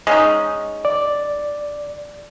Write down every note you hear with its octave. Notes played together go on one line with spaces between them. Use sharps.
G#3 C#4 D#4
D5